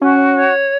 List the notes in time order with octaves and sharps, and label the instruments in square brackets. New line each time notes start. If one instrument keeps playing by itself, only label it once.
[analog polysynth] C#4 [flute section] F#4
[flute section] C#5